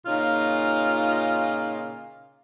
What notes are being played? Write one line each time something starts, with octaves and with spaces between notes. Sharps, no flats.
A#2 C#3 D#4 F4